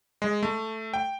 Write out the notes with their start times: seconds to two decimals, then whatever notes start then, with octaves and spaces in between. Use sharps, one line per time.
0.22 G#3
0.43 A3
0.94 G5